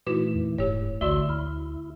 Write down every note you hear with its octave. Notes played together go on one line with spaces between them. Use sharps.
A#2 E3 A3 D#4 E4 F#4 D6
F2
D#1 G#2 G4 C#5
A1 D2 D3 A3 F#4 D5 C6 E6
D2 E4 F6